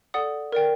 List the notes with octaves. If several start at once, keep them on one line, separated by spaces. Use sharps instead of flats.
A4 D5 F#5 D#6
A#4 D5 G5